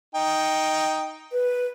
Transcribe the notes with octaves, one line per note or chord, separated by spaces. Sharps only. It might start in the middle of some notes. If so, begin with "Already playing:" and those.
D#4 G5
B4